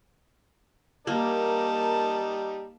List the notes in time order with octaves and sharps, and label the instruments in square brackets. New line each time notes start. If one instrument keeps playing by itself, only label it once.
[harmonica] G3 D#4 [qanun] A#3 [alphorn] A#4 [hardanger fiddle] A5